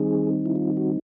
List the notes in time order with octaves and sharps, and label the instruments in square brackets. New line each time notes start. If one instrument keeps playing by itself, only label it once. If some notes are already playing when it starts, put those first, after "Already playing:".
Already playing: [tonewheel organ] D#3 G3 C4 D#4 G#4
E4
F4
F#4